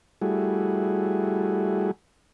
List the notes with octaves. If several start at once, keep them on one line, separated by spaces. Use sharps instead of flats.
G3 A3 E4 F#4 G#4